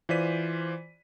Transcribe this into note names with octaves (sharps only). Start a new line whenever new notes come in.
E3 F4 C5 D5 B6 D#7